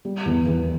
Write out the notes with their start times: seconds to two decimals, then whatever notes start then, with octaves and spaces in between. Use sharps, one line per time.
0.05 G3
0.25 E2
0.46 E2